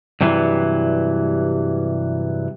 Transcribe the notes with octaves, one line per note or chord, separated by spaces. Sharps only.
G2 C3 E3 F#3 G3